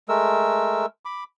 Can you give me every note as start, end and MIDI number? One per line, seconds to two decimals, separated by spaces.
0.09 0.86 56
0.09 0.86 57
0.09 0.86 70
0.09 0.86 88
1.05 1.24 83
1.05 1.24 86